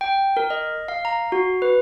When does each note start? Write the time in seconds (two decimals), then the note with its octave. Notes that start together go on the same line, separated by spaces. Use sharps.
0.01 G5
0.37 A#4
0.50 D#5
0.88 F5
1.05 A#5
1.32 F#4
1.62 B4